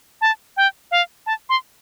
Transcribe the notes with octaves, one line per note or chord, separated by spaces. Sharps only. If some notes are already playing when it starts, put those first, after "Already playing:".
A5
G5
F5
A5
C6